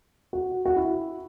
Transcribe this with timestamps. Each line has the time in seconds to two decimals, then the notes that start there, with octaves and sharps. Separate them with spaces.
0.33 F#4
0.65 F#4
0.76 E4